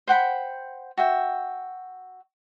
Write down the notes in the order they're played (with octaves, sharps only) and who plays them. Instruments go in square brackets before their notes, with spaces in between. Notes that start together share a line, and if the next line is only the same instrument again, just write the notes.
[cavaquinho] C5 F#5 G5 B5
F#4 E5 G5